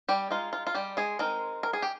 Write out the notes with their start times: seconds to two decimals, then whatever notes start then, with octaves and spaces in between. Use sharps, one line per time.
0.09 G3 G4
0.31 G#3 D#4 F4
0.53 F4
0.67 F4
0.75 G3 G4
0.97 G#3 G#4
1.19 G#3 A#3 C4 D#4 A#4
1.63 A#4
1.73 G#4
1.82 G4